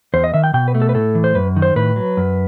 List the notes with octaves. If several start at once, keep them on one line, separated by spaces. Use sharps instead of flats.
E2 C5
D#5
D#3 E5
G5
B2 G5
B4
A3
A4
B4
A2 A4
E3
C5
F#2 B4
D#3
C5
A2 B4
F#3
F#2